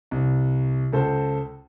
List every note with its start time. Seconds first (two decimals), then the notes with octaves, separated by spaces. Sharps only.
0.11 C2
0.93 C#2 A4 C5